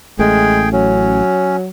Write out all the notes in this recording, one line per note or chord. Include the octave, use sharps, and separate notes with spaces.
A1 G#3 A3 G#4 G5
F#3 C#4